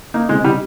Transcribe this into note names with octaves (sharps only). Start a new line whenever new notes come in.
A#3 D#4
C3 G#3
G3 D#4